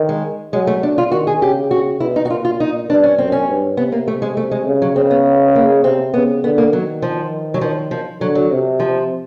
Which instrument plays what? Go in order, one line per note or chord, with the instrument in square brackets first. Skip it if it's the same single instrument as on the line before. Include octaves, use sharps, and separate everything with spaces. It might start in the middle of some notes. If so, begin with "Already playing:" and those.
Already playing: [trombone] D#3
[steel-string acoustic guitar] G#3
[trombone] F#3 [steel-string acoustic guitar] G#3
[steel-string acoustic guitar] A3
D4
F4
[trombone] D#3 [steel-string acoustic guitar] F#4
[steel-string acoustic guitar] G#4
[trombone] C#3 [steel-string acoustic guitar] G4
[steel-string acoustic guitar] F#4
[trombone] B2 [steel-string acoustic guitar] E4
[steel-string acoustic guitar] D#4
F#4
[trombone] A#2 [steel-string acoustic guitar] F4
[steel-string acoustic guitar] F4
D#4
[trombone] G2 [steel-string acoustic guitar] D4
[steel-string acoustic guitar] C#4
[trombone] F#2 [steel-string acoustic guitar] C4
[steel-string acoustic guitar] C#4
[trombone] G2
[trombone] C3 [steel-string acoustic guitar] B3
[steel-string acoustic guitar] A#3
A3
G#3
A3
G#3
[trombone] C#3
[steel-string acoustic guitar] F#3
[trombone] C#3 [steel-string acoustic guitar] C4
[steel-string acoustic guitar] B3
A#3
[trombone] C3 [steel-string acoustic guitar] C4
[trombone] C#3 [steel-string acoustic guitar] B3
[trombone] D3 [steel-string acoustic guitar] B3
[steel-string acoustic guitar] A#3
[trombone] D#3 [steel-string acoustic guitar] F#3
[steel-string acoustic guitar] F3
F#3
[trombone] D#3 [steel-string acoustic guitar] F3
[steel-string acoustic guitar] F3
[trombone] D3 [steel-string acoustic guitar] F#3
[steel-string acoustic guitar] F#3
[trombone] C3
[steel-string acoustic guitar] F3